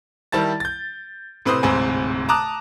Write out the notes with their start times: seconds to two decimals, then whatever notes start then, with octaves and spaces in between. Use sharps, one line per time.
0.32 D#3 G3 E4 A5 A6
0.60 G6 A6
1.45 A2 C3 B4 C5 C6 D#6
1.63 D1 G#2 C3 C5 G#5 B5
2.29 A5 A#5 D6 D#6 F#6